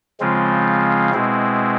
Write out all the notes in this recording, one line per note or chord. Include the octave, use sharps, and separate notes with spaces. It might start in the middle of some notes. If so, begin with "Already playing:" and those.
C#3 F3 G#3 C4 F4
B2 G#3 C4 E4